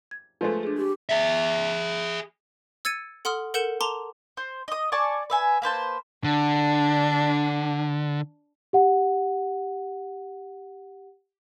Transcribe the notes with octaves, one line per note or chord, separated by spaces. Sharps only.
G#6
F3 G#3 A3 B4
D4 G#4
G4
G#4 E5
E6 G#6 A6 C#7 D#7
A4 F#5 C6 D#6 F6
A4 A#4 F#5 G6 C#7 E7
A5 A#5 C6 D6 F7 G7
C5
D#5 D#6
D5 G#5 A5 C#6
B4 E5 G#5
A#3 B4 C5 A5
D3 D4
G4 F#5